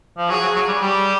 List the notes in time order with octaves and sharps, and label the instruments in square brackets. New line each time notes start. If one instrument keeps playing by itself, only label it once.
[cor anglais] F3
[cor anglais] F#3 [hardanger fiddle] G#4
[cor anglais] F#3
F#3
G3
[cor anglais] G3 [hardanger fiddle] G4